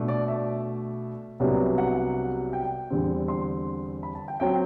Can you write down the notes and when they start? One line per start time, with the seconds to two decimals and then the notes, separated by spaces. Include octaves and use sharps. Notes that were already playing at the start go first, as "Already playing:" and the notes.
Already playing: B2 A3 D4
0.08 D5
0.28 E5
1.40 C2 C3 F#3 B3 D4
1.78 F#5
2.53 G5
2.90 E2 D3 G3 C4
3.28 C6
4.03 B5
4.15 A5
4.28 G5
4.40 F#3 C4 G5